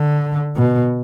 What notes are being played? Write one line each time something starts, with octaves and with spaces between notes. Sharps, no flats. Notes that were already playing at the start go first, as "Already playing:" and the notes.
Already playing: D3
B2